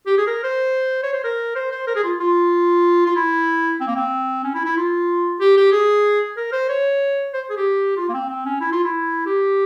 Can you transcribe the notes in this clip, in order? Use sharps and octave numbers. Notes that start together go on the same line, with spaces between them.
G4
G#4
A#4
C5
C#5
C5
A#4
C5
C5
A#4
G#4
F4
F4
F4
E4
C4
A#3
C4
C#4
E4
E4
F4
G4
G4
G#4
A#4
C5
C#5
C5
G#4
G4
F4
A#3
C4
C4
C#4
E4
F4
E4
G4